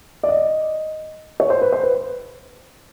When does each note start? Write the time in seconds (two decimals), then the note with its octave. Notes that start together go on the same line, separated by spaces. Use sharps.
0.23 D5
0.28 D#5
1.40 C#5
1.50 C5
1.61 B4
1.72 C5
1.83 B4